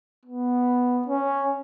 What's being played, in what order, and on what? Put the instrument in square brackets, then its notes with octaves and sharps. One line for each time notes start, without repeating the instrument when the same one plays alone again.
[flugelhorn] B3
C#4